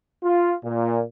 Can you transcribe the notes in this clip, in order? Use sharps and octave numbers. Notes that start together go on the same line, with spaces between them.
F4
A#2